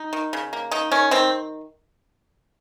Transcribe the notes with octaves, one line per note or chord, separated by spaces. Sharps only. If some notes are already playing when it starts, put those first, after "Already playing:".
Already playing: D#4
D#3
C#3
A#3
D#3 D#4
D#3 C#4
D#3 C4